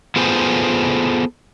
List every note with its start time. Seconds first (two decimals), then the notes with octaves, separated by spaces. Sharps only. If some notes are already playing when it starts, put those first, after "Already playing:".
0.16 B3 F4 G#4 A4 C5 G#5